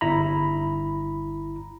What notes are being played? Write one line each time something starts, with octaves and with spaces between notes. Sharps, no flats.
G1 E4 A#5 B5